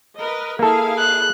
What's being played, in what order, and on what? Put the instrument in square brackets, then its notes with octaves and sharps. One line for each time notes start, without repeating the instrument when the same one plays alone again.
[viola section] A#4 B4 D#5
[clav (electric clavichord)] A#3 A4 [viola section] E4 G#4 F5
[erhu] F#6